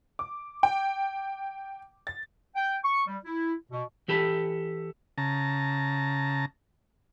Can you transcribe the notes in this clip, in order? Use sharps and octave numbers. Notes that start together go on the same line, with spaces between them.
D6
G5
A6
G5
C#6
G3
E4
B2
E3 G4 A4 B5
C#3 A5 A#5